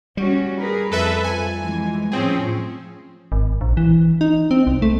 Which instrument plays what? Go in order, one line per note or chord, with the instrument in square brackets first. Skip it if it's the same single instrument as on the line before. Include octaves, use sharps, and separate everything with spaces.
[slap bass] G3 [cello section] C#4 F#4
[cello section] G#4 A#4 B4
[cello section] F2 [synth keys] A4 B4 E5
[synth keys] G#5
[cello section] F2 E3 G#3
[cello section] A2 F3 C#4 [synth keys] C4 G#4
[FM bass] G#1
A#1
E3
D#4
C4
C2
A3